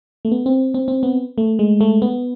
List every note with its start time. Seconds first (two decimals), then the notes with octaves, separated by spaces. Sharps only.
0.25 A3
0.32 B3
0.46 C4
0.74 C4
0.88 C4
1.03 B3
1.38 A3
1.59 G#3
1.81 A3
2.02 B3